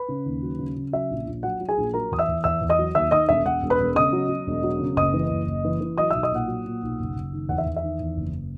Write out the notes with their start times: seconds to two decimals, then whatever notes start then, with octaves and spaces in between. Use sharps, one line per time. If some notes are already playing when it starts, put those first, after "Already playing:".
Already playing: B4 B5
0.09 C#3
0.26 D#2
0.43 F#3
0.59 C#3
0.76 C#3
0.93 F#3 E5
1.10 A#1
1.27 A#1
1.43 F#3 F#5
1.60 F#3
1.69 G#4 G#5
1.77 A#1
1.93 F#3 A#4 A#5
2.11 E2 D#6
2.19 E5 E6
2.28 E2
2.44 E2 E5 E6
2.61 E2
2.69 D#5 D#6
2.79 F#3
2.95 D#2 E5 E6
3.11 D#3 D#5 D#6
3.29 E1 E5
3.45 E1 F#5
3.62 E1
3.70 B4 B5
3.80 E1
3.95 C#3 D#5 D#6
4.13 F#3
4.29 F#3
4.47 E1
4.63 F#3
4.80 C#3
4.96 F#1 D#5 D#6
5.14 E3
5.30 F#1
5.47 F#1
5.65 E3
5.81 E3
5.98 F#3 D#5 D#6
6.11 B1 E5 E6
6.23 D#5 D#6
6.32 A#2 F#5
6.48 F#3
6.65 A#2
6.82 B1
6.99 F#1
7.16 F#1
7.33 D#3
7.49 E2 F#5
7.58 E5
7.66 E2
7.76 E5
7.83 D#3
8.00 E2
8.17 F#1